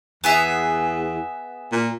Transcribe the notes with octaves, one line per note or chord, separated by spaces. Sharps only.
E2 B3 G#4 E5
A#2